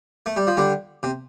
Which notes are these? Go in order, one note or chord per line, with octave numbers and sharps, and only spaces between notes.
A3
G3
F3
D3 G3
C3